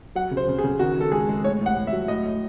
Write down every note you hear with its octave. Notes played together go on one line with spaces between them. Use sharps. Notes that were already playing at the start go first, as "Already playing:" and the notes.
F#3 F#5
C#3
C5
C#3
G#4
C#3
D#3 F#4
D#3 A4
G#3 G#4
G#3
A2 C#5
A2 F#5
A2
E5
F#3
A2 D#5
A2